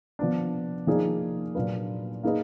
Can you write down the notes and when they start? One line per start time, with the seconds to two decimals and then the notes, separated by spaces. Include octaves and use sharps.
0.19 F3 B3 D4
0.87 F3 A#3 D#4 G#4 D5
1.55 A#2 F#3 D4 F4 B4
2.23 A#3 D#4 G#4 B4 D#5